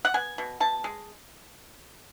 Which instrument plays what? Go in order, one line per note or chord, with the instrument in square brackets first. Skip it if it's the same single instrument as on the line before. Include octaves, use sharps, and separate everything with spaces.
[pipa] F#5
B3 G#5
B2
B2 A5
G#3